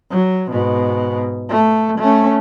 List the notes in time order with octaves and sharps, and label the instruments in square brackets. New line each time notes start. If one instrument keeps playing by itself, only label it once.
[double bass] F#3
G#2 B2
A3
A3 C#4